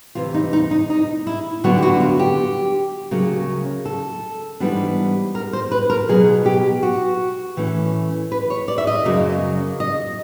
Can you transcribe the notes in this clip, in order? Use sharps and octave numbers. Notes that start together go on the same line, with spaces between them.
D2 C3 E3 F4
D#4
D#4
D#4
D#4
E4
D2 D3 F#3 B3 D4 F#4
G4
F#4
F4
G4
D2 C#3 F#3 A#3 C#4
A4
G#2 E3 G3 B3 D4
A#4
C5
B4
A#4
B2 F#3 B3 G#4
G4
F#4
A2 E3 A3 C#4
B4
C#5
D5
E5
D#5
F#2 C#3 F#3 A#3
D#5